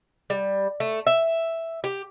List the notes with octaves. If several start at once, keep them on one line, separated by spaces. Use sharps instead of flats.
G3
A3
E5
G4